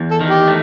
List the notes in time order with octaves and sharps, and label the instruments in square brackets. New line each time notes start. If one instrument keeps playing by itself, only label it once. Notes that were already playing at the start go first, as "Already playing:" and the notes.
Already playing: [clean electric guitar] E2
[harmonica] A4
[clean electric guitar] D#3
[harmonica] G4
[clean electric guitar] A3